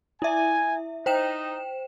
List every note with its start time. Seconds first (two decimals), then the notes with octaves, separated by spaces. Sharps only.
0.22 E4 E5 G#5
1.06 D#4 C5 G5 E7